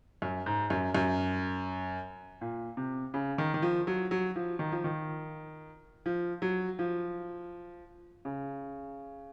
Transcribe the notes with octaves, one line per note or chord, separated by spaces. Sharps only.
F#2
G#2
F#2
F#2
A#2
C3
C#3
D#3
D#3
F3
F#3
F#3
F3
D#3
F3
D#3
F3
F#3
F3
C#3